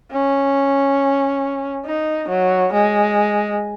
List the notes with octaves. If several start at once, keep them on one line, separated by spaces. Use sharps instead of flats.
C#4
D#4
F#3
G#3